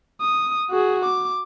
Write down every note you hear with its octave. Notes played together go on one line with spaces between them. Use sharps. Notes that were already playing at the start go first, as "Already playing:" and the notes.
D#6
F#4 G#4
D6